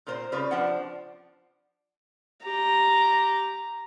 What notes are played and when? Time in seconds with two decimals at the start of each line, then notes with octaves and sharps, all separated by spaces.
0.07 A#2 F4 A#4 C5
0.32 C#3 G3 F4 B4
0.51 F3 D4 F4 C5 F#5
2.46 G4 A#5